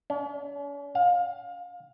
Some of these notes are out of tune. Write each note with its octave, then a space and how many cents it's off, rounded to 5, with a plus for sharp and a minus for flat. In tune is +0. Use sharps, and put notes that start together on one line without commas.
C#4 +45
F5 +25